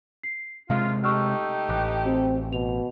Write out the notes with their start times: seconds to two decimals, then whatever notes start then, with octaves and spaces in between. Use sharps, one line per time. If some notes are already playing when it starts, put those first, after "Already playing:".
0.23 C7
0.70 C3 G#3 F4 F5
1.04 A3 D#4 G4 C#6 E6 F6
1.69 A1 D6 F#6
2.06 C4 F#4
2.53 B2 F7